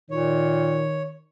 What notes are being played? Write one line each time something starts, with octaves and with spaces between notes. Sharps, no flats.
A#2 D#3 C#5